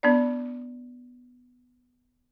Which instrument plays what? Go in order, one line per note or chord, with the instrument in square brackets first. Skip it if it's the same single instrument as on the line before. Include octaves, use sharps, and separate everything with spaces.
[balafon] B3 D4 D5